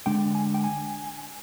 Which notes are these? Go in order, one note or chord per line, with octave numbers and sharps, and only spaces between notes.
D3 G#3 D4 G5
G#5
G5
G#5